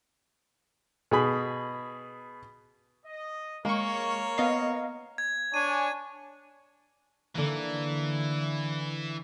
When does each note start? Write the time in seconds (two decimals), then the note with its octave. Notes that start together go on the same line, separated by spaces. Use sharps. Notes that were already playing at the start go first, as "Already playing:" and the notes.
1.11 B2 G#4 B5
3.04 D#5
3.65 G#3 A#3 A#4 C#5 C#6
4.38 B3 D#5 F5
5.18 G#6
5.54 D4 C#5 G#5 D#7
7.35 D3 E3 A#3